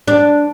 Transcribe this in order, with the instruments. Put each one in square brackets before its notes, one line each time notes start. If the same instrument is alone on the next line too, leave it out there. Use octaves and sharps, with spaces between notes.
[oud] D4